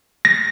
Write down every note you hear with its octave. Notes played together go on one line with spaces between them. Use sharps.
A#6